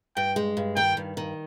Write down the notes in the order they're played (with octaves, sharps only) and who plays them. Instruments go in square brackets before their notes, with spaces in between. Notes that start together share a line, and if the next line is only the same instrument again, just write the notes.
[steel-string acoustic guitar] G2 [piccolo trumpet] G5
[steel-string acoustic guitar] G#3
G2
[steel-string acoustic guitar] D#3 [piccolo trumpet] G5
[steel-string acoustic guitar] G2
D#3